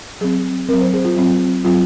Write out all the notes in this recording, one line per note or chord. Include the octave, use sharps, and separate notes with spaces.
F#3 C4 G#4
F#3 C4 A#4
C5
G#4
F4
F#3 C4
F#3 C4 F4